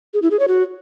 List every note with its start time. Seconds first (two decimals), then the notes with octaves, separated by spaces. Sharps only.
0.14 G#4
0.22 E4
0.31 G#4
0.39 C#5
0.48 F#4